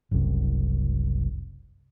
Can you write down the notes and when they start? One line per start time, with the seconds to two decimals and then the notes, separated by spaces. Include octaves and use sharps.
0.11 F#1 C2